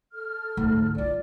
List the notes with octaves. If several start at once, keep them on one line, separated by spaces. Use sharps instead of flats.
A4 F6
D2 G#2
D4 F4 D5